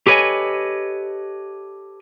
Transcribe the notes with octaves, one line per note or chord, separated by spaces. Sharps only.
G4 A4 B4 C#5 D#5 G#5